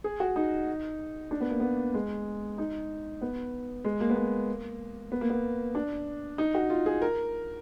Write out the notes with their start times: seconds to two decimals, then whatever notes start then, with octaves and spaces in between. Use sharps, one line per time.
0.04 G#4
0.20 F#4
0.36 D#4
1.31 D4
1.41 B3
1.50 A#3
1.60 B3
1.94 G#3
2.58 D#4
3.21 B3
3.85 G#3
4.01 A#3
4.10 B3
4.17 A#3
5.12 B3
5.21 A#3
5.30 B3
5.75 D4
6.38 D#4
6.55 F#4
6.70 F4
6.86 G#4
7.02 A#4